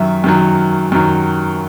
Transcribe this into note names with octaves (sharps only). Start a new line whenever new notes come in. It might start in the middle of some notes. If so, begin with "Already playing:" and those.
Already playing: F#2 D#3 F#3 E5
F#2 D#3 F#3
F#2 D#3 F#3